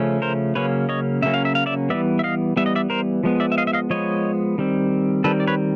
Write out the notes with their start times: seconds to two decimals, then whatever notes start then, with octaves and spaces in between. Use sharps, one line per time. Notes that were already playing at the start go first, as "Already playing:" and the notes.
Already playing: C#3 F3 A3 C#4
0.22 A#4 C5
0.55 C#3 F#3 A#3 C#4 B4 C#5
0.89 C#5 D#5
1.23 C#3 F#3 A#3 C#4 E5
1.34 F5
1.45 E5
1.55 F5
1.66 D5 E5
1.90 E3 G3 B3 D5 E5
2.19 E5
2.24 D#5 F5
2.57 E3 G3 B3 E5
2.66 D#5
2.75 D5 E5
2.90 A#4 C5
3.24 F3 G#3 B3
3.40 D5 E5
3.52 E5
3.58 D#5 F5
3.67 E5
3.73 D#5 F5
3.90 F3 G#3 B3 C#5 D#5
4.58 D#3 G3 C4
5.24 D#3 G3 C4 A4 B4
5.40 D5
5.47 B4 C#5